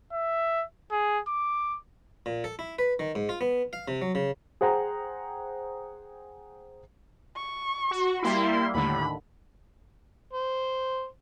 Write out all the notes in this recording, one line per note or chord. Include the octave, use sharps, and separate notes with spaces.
E5
G#4
D6
A#2
A4
E4
B4
D#3
G#2
F4
B3
F5
C3
F#3
C#3
G#4 C5 F#5 G5 A#5
C#6
F#4
G3 A#3 E4 C6
D#2 A2 D3 B5
C5